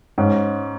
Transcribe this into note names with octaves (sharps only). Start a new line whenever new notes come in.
G#2 C#4